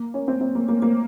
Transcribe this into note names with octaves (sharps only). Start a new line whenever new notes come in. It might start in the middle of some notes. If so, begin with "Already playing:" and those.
Already playing: A#3
C#4
C4
C4
A#3
A#3
A#3